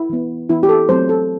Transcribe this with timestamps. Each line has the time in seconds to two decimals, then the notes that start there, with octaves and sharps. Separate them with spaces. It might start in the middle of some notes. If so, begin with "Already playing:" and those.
Already playing: E4
0.10 E3 B3
0.49 E3 B3 E4
0.63 G4
0.69 A4
0.89 F#3 A3 C4 C5
1.09 A4